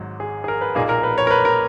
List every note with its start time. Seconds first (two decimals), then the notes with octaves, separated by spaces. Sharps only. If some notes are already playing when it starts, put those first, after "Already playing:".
Already playing: G#1 G#2 F#3
0.20 G#4
0.44 G#4
0.48 A#4
0.61 B4
0.75 B1 A#2 A#3 G#4
0.89 A#4
1.03 B4
1.18 C#5
1.27 A#4
1.31 B4
1.45 A#4